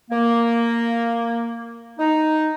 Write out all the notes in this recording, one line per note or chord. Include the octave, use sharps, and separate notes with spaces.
A#3
D#4